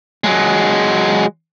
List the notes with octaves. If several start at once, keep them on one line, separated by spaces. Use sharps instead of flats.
F#3 G#3